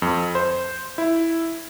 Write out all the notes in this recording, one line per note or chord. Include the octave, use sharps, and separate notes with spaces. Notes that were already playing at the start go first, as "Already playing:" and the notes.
F2
C5
E4